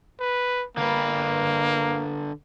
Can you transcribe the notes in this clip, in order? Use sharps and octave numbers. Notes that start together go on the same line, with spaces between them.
B4
D3 A#3 B4